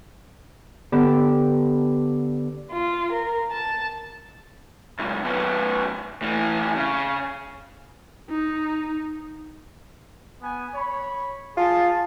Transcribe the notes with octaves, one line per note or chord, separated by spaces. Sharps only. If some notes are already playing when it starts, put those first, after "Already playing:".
D3 B3 G4 A4
F4
A#4
A5
C#2 F#2
F#2 B3
A2 E3
C#3
D#4
B3 B4 G#5
C#5 B5
F4 G#4 A5